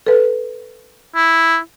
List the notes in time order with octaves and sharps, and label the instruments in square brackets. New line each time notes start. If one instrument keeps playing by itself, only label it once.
[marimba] A4 B4
[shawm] E4